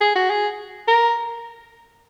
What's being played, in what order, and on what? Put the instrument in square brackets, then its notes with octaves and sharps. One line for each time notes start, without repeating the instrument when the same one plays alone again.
[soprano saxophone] G#4
F#4
G#4
A#4